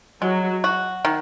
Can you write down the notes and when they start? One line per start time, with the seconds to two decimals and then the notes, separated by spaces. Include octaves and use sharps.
0.22 F#3 G#3
0.64 F#4
1.05 D#3